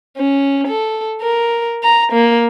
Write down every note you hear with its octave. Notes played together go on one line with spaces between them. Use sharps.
C#4
A4
A#4
A#5
A#3